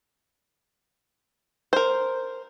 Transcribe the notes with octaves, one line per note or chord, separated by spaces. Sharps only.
A#4 C5